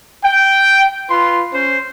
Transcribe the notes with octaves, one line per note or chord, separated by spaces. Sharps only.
G5
F4 B4 C6
C#4 C5